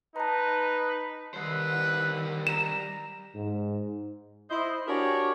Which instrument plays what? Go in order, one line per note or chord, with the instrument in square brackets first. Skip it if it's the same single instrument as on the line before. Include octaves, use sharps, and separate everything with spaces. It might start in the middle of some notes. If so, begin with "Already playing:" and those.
[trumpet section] D#4 B4 [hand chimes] A5 A#5
[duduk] D#3 [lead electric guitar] G3 C5 [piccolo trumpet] B4
[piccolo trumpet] A#5 [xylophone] E7
[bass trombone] G#2
[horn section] E4 C5 D#5
D4 F#4 G4 A#4 C#5 G#5